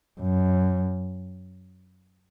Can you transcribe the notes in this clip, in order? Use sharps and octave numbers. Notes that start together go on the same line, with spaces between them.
F#2